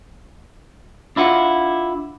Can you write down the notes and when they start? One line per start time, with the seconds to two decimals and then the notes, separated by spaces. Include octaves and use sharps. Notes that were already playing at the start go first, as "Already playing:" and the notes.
1.16 D4 E4 F4 F#5